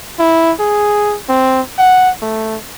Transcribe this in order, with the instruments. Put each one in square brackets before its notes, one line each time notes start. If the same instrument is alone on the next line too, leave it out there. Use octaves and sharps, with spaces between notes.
[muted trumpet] E4
G#4
C4
F#5
A3